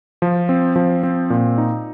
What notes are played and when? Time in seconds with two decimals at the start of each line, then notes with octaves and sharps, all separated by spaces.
0.22 F3
0.49 C4
0.76 F3
1.03 C4
1.30 A#2
1.58 D#4